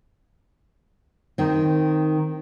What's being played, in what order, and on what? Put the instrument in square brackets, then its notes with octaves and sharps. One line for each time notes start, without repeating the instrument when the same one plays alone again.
[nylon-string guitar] D#3 C4